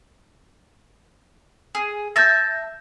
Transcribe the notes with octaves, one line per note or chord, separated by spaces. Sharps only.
G#4
E5 A5 G6 A#6